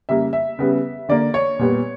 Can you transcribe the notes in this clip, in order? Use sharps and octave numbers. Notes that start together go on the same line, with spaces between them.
C#3 G3 A#3 E5
E5
C#3 G3 B3
D3 A#3 D5
C#5
A#2 G3 B3